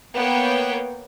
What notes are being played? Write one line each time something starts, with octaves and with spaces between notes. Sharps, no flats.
A#3 B3 C#5 G5